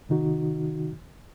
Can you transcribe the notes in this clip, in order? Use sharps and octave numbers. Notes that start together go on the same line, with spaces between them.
C3 D#3 D#4 F#4